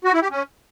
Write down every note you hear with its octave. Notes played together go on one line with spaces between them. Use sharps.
F#4
E4
G4
C#4